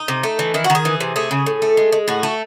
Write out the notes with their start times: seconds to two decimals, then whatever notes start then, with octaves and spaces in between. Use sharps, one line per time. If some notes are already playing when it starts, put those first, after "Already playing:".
Already playing: D#4
0.08 C3
0.23 A3
0.39 E3
0.54 D#3 E4
0.64 F#4
0.70 D#3
0.75 G#4
0.85 E3
1.01 C3
1.16 A3 G#4
1.31 C#3
1.46 A2
1.62 A3
1.77 G#3
1.92 G#3
2.08 A2 F#4
2.23 A3